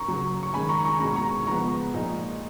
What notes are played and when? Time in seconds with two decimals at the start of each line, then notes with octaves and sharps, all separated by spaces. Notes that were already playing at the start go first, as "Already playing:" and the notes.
Already playing: A#5 C#6
0.08 C#3 F#3 C#4
0.43 C#6
0.54 D#3 G#3 C#4 G#5 B5
0.69 A#5 C#6
0.84 A#5 C#6
1.00 B2 G#3 C#4 A#5 C#6
1.16 A#5 C#6
1.47 C#3 F3 G#3 B3 A#5 C#6
1.94 A#2 F3 G#3 D#4